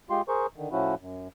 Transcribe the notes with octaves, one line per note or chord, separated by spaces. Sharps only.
G#3 F4 G4 C6
G#4 A#4 C5 C#6
D3 D#3
A2 F3 C#4 E4 F#4
F#2